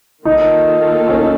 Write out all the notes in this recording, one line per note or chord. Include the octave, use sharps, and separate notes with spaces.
D#3 A#3 D#4 F4 A4
C#4
D#4